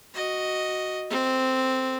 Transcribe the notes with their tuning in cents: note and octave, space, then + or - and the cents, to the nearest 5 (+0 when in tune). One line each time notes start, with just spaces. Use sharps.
F#4 +0 D#5 +0
C4 -5 A4 +0